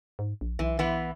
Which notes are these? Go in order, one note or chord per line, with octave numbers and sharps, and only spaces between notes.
G#2
A#1
B1 E3
E3 B3